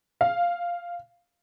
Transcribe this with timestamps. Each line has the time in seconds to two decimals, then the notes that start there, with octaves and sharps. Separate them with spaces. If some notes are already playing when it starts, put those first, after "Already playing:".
0.21 F5